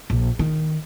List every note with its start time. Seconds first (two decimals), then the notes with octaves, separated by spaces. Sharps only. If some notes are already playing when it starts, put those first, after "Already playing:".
0.10 A#1
0.39 D#3